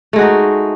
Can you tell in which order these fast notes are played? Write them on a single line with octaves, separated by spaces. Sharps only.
A3 G#3 F#4 D#4